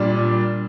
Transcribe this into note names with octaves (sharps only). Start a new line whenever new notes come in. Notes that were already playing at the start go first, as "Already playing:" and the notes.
Already playing: A#2 G3 D4